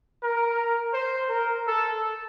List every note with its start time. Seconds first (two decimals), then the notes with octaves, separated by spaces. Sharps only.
0.24 A#4
0.94 C5
1.30 A#4
1.66 A4